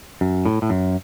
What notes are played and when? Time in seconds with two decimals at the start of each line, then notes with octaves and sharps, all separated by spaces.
0.21 F#2
0.45 A2
0.62 A2
0.70 F#2